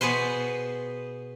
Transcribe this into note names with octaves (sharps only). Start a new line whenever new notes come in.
B2 B3 G#4 B4 C5